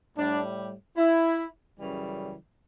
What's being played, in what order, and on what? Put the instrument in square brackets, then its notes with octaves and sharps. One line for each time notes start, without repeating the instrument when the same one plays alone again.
[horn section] A2 G3 D4
E4
F#2 C#3 E3 G3